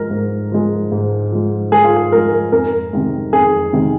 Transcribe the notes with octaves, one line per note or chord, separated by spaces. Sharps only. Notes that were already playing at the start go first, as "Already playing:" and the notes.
Already playing: G#2 F3 G#3 A#4
G#2
F3 G#3
G#2
F3 G#3
G#2 G#4
F4
G#4
F3 G#3 A#4
F2 A#4
C3 D#3 G#3
F2 G#4
C3 D#3 G#3